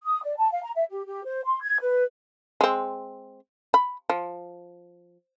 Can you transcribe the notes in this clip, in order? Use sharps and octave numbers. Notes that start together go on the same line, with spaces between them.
D#6
D5
A5
F5
A#5
E5
G4
G4
C5
C6
G#6
B4
G#3 C4
B5
F3